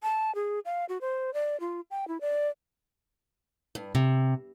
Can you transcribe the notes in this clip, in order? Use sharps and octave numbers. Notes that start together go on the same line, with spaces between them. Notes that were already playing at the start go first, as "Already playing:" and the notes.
A5
G#4
F5
F#4
C5
D5
F4
G5
E4
D5
G2
C3